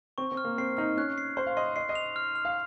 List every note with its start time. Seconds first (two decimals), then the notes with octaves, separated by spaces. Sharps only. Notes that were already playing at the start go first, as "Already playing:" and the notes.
0.18 C4 C#6
0.32 C4
0.37 F6
0.44 A#3
0.58 C4 C7
0.77 D#4 F6
0.97 C#4 F#6
1.18 C7
1.37 C5 C6
1.46 F5
1.57 D#5 C6
1.76 D#5 C7
1.89 D#5
1.95 F7
2.16 F6
2.35 F6
2.45 F5